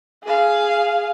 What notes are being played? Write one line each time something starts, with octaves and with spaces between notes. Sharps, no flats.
G#4 F5